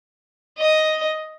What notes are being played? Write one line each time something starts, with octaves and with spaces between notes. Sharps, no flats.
D#5